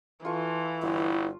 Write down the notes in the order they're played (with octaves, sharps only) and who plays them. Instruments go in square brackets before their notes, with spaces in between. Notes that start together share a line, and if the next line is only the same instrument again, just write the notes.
[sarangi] E3 [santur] F4 A4 C#6
[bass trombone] G1 [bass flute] E4